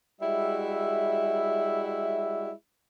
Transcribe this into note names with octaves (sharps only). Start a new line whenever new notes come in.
G3 G#3 E4 F#4 E5